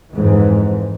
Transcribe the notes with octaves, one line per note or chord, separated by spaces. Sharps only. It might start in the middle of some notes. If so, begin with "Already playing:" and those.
F2 G#2 E3